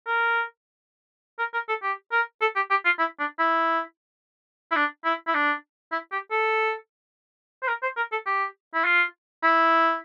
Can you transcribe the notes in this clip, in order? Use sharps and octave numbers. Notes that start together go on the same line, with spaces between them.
A#4
A#4
A#4
A4
G4
A#4
A4
G4
G4
F4
E4
D4
E4
E4
D4
E4
E4
D4
E4
G4
A4
C5
A#4
C5
A#4
A4
G4
E4
F4
E4